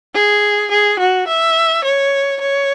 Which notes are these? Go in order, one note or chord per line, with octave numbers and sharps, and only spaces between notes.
G#4
G#4
F#4
E5
C#5
C#5